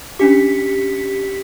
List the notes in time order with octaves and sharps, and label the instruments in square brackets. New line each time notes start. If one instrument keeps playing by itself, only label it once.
[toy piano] C#4 D4 D6 [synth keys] G4 B6 C#7